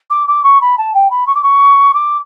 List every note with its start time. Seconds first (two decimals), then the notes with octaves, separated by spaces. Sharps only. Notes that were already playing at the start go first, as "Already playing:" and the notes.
0.10 D6
0.28 D6
0.43 C#6
0.61 B5
0.78 A5
0.94 G5
1.10 B5
1.27 C#6
1.35 D6
1.43 C#6
1.94 D6